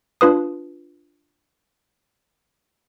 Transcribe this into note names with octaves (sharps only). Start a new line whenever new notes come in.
D4 F4 B4 D#6